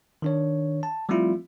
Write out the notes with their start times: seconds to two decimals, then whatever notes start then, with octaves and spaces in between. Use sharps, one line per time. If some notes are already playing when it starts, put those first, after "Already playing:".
0.22 D#3 D4 C#5
0.83 A5
1.09 F3 G3 A3 C4 E4 F4